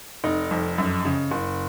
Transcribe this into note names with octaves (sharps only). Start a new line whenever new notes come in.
F1 D#4
F2
F#2
C#3
F#1